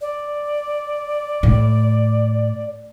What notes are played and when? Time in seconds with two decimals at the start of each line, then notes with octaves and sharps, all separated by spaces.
0.01 D5
1.43 A2